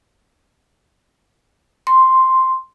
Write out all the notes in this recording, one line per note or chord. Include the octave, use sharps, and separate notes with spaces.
C6